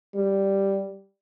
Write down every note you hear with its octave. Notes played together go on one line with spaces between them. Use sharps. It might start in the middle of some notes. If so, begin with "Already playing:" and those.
G3